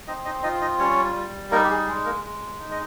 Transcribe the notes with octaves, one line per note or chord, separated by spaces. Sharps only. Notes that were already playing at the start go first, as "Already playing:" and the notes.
C4 D#4 D#5
D#4 D#5
D#4 F4 D#5
D#4 D#5
G3 C#4 C#5
G3
A#3 D#4 A#4
G4
G#4
G#3 G#4
A#3 A#4
G#3
D#4
D#5